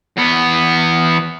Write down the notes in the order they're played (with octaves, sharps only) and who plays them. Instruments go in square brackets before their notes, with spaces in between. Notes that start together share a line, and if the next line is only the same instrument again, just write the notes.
[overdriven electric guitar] E2 B3